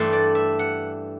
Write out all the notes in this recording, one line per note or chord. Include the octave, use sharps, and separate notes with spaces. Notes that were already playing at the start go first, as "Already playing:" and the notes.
Already playing: G2 E3 A3 D4 C6
D5
E5
F#5